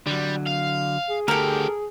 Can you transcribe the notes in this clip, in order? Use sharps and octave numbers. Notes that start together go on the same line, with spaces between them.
D3 F#3 G3
F5
G#4
D2 D3 G4 A4 A#4